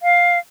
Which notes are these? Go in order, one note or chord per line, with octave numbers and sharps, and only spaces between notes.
F5